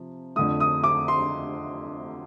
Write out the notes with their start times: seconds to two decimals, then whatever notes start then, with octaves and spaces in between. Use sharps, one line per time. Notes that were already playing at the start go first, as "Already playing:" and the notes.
Already playing: C3 F3
0.36 F2 D3 A3 D#6
0.60 D#6
0.84 D6
1.08 C6